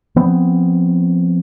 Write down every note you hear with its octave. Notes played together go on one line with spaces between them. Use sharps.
F3 B3 C4